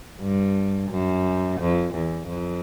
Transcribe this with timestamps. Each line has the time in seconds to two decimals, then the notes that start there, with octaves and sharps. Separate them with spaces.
0.20 G2
0.90 F#2
1.60 F2
1.94 E2
2.29 F2